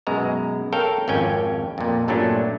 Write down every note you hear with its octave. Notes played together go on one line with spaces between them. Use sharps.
F#2 B2 G#3 A#5
A4 A#4 C#5 F5 G5
G#1 F2 C#4 G5 G#5
F2 A#2
G2 A#2 F#3 A3 C#4 D4